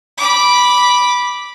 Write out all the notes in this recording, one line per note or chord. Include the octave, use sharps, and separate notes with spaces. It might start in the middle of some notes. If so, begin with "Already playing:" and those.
B5 D6